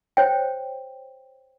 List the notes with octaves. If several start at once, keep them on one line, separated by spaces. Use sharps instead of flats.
C5 C#5 G5